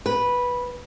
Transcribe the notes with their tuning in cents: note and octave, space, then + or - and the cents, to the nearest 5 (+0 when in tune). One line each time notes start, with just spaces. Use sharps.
B4 -10